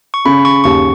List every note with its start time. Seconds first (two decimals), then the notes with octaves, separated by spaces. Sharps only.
0.14 C#6
0.25 C#3 B5
0.45 C#6
0.64 D#2 C#6